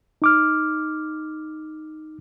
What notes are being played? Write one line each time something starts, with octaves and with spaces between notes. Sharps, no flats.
D#4 D6 F6